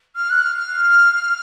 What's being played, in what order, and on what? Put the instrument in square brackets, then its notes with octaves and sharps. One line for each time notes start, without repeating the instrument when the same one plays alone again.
[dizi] F6
F#6
F6